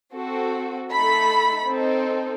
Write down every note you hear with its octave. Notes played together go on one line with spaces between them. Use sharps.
C4 F#4 A4
A3 D#4 A4 B5
C4 D#4 A4